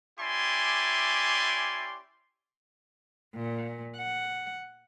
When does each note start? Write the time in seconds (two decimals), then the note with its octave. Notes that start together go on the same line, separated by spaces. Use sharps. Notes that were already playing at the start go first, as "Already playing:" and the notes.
0.19 C#4 E4 G4 D5 G#5 C6
3.36 A#2
3.97 F#5